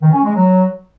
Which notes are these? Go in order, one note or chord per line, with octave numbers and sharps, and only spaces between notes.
D#3
C#4
G#3
F#3